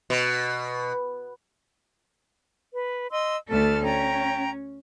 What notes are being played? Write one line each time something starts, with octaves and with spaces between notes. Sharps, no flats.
B2
B4
D#5 C6 E6
D2 A3 A4 A5 F6
C#4 G5 A#5